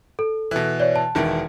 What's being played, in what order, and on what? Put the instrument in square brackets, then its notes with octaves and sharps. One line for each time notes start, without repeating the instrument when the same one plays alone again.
[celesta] A4
[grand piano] B2 E3
[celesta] C#5 D5
A5
[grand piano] E1 D#3 E3